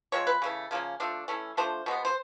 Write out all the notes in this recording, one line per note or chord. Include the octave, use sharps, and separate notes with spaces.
F3 G#3 C4 C#5
B4
C#3 E3 A3
C#3 F3 A#3 C#4
F3 A3 D4
E3 A3 C#4
F3 A3 D4 C5
B2 G#3 B3
C5